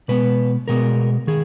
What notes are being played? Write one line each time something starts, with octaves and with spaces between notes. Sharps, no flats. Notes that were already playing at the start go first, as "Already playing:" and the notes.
B2 G#3 B3 B4
B2 G#3 B3 A#4
D#3 G#4